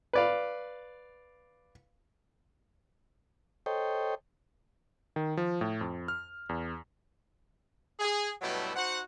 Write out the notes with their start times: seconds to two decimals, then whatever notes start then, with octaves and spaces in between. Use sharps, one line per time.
0.13 B4 D5 F5
3.66 A4 C5 C#5 D#5 G5
5.16 D#3
5.37 F3
5.61 A2
5.81 F2
6.08 F6
6.49 E2
8.00 G#4
8.42 G2 B2 F#3 G3 A3 E4
8.76 D#4 F#4 C5 F#5